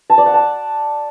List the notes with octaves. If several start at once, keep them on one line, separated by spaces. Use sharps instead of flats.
A5
D5
F#5
A5